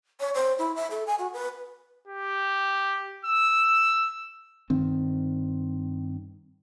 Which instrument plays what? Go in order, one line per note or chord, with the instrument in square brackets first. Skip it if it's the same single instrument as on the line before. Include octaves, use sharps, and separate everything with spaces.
[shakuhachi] C#5
C5
E4
E5
A4
G#5
F#4
B4
[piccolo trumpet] G4
E6
[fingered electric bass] G2 D#3 C4